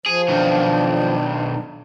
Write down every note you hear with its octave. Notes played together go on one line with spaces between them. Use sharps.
F3 G#4
B1 D#3 D4